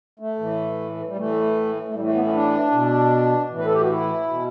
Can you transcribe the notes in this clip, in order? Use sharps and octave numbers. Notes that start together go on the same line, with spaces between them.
A3
A2 E3
G3
A2 E3 A3
A3
A2 G3
E3 A3
B3
C#4
D4
B2
A2 E3
B4
A4
G4
F#4
E4
B2